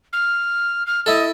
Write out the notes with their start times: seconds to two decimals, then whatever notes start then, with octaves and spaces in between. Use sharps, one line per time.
0.13 F6
0.86 F6
1.06 E4 A4 D#5